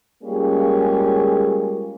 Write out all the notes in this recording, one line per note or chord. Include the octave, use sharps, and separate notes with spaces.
G3 G#3 A#3 C#4 F4 G#4